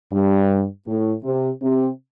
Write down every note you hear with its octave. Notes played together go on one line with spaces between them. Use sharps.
G2
A2
C3
C3